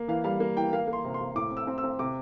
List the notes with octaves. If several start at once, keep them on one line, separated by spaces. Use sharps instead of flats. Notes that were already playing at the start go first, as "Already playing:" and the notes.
Already playing: A#3
E3 F5
G3 F5
A#3
E3 G5
A#3 F5
A#3
C6
C3
C6
C3
A2 D6
C4
E6
C4
E6
C4
C3 D6